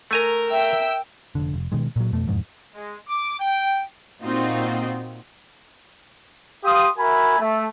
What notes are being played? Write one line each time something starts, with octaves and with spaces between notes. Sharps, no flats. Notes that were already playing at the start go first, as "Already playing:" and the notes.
A3 A#4 G#5 A#5
E5 G5 E6
F1 D3
F1
B2 D#3 G#3
A#2 F#3
F2 B2 A3
E1 F2 G#2
G#3
D6
G5
A#2 C4 D#4 F4 F#4
G4 F5 C6 D#6
F#4 A#4 E5 G#5 B5
A3